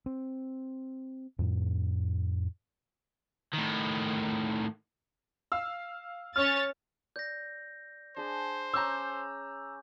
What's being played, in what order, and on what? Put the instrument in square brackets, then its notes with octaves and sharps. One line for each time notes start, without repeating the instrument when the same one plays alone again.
[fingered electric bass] C4
F2 A2
[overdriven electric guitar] A2 D#3
[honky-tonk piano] F5 E6
[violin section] C#4 C#5 A6 [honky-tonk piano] F6
[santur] D5 [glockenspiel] G6 A#6
[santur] D4 G#4 [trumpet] C5
[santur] C#4 [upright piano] A#5 E6 [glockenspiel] D6 G6